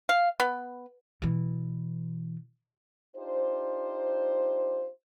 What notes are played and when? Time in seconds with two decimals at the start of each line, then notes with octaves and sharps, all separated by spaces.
0.09 F5
0.40 B3
1.22 B2 E3
3.16 D4 D#4 F4 G4 C5